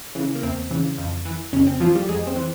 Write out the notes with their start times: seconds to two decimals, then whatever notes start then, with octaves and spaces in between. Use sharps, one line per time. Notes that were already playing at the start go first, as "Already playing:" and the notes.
0.15 C#3 E3
0.35 A#3
0.43 E2 C4
0.71 C#3 E3
0.98 F2
1.25 E3
1.53 F2 C#3 C#4
1.67 C4
1.80 E3 F3 F4
1.95 G3 G4
2.09 F2 G#3 G#4
2.27 C4 C5
2.36 E3